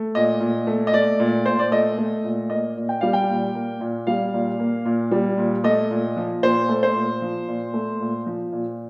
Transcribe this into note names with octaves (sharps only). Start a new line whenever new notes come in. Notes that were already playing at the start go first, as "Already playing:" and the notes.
Already playing: A3
A#2 D#5
A#2
A3
D#5
A3 D5
A#2
A#2 C5
D5
A3 D#5
A3
A#2
A#3 D#5
A#2
G5
G3 F5
G5
A#2
A#3
A#2
G3 F5
A#2
A#3
A#2
G3
A#2
A3 D#5
A#2
F3
A#2 C5
A3
C5
A#2
F3
A#2
A3
A#2
F3
A#2